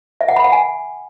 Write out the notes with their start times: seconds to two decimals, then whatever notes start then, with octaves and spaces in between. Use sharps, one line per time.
0.21 E5
0.28 F#5
0.36 B5
0.44 F#5
0.52 G#5